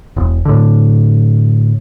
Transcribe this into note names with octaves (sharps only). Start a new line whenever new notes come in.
E1
A2 D3